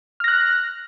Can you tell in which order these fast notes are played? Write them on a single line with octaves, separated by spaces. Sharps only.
F6 A#6 F#6